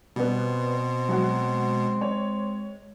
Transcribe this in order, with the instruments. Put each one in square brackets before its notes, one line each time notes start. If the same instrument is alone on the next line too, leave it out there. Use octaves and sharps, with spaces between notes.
[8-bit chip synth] B2 [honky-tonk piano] G3 B3 [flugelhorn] C4
[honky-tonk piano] F#3 F#4 [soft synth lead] G#3
[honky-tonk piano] C#5